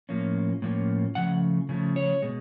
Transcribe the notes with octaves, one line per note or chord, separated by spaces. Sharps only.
A2 F3 A#3 C#4
A2 F3 A#3 C#4
C#3 F3 A3 F#5
C#3 F3 A3
C#5
B2 G#3